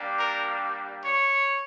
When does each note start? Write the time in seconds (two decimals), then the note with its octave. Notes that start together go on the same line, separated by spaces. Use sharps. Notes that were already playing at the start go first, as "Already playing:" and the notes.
Already playing: G3 A#3 D4 G4
0.19 A#4
1.03 C#5